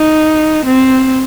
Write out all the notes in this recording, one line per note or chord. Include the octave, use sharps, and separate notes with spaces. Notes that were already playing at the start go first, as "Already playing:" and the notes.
Already playing: D#4
C4